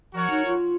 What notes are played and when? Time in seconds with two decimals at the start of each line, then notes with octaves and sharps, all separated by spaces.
0.14 F3 F#4 A#4 C#5 F#5
0.30 D#4
0.46 F4